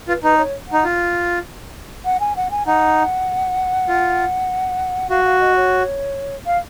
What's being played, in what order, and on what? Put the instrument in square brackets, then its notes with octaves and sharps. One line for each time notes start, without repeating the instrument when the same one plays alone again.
[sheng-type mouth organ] F4 [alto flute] B4
[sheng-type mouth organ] D#4 [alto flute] B4
[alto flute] C#5
[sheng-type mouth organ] D#4 [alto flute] F#5
[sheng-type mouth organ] F4
[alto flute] F#5
G#5
F#5
G#5
[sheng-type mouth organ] D#4 [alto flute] F#5
[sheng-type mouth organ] F4
[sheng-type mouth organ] F#4 [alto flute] F5
[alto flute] F5
D#5
C#5
F5